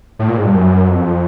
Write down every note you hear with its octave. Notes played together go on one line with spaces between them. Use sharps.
A2
A#2
G#2
G2
F#2
F2